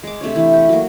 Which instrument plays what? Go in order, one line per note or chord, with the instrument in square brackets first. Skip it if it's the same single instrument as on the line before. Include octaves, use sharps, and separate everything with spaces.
[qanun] G#3 D6
C3 A3 D4 C#5
E3
G4 C#6
F#3 A#3